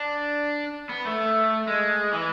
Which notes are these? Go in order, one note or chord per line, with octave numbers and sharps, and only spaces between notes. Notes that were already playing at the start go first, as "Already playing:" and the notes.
Already playing: D4
B3
A3
G#3
E3